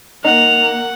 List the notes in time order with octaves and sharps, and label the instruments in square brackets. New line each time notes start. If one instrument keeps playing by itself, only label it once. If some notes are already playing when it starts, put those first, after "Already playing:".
[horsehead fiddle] A#3 [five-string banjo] D#4 [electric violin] F#5 [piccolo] F7